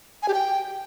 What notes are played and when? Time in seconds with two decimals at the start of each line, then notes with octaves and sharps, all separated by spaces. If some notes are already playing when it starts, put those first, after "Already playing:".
0.22 G#5
0.28 G4
0.34 G5